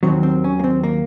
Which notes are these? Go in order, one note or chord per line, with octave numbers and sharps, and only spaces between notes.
D#2 D#3 F#3 C4
C4
C#4
A#3
C4
A#3